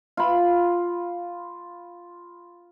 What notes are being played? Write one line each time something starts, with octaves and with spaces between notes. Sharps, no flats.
F4 B5